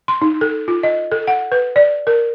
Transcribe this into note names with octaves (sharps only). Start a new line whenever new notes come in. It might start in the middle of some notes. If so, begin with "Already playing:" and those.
C6
D#4
A4
F4
D#5
A4
F#5
B4
D5
A#4